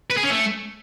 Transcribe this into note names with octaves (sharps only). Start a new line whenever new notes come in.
B4
G#4
C#4
A3